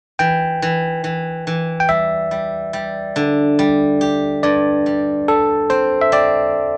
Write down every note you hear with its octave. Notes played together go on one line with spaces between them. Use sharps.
E3 G5
E3
E3
E3
G5
G3 E5
G3
G3
D3
G3
G4
G2 D5
G3
G3 A4
C4 C5
E5
C4 D5